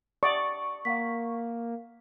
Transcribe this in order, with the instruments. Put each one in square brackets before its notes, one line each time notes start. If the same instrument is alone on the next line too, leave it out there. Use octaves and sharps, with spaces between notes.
[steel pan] D5 [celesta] E5 F#5 D#6 [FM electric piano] C#6
[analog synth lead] A#3 [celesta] F5 F#5 B6